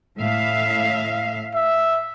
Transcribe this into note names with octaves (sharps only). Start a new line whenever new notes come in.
A2 E5 F5
E5